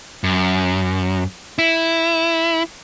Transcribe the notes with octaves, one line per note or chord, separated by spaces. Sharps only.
F#2
E4